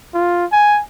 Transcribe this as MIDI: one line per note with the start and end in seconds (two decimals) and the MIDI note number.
0.14 0.45 65
0.52 0.81 80